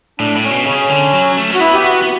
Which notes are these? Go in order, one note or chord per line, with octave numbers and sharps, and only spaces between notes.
A2 D4
A2
C#4
B2
C#3 C#4
D3
F#3
A3
C#4 F#4
B3 E4
G4
B3 F#4
B3